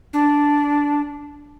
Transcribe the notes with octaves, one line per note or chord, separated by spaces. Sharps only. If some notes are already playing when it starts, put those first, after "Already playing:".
D4